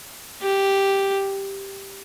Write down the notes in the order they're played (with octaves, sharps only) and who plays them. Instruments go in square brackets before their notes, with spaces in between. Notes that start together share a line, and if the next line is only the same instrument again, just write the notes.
[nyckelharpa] G4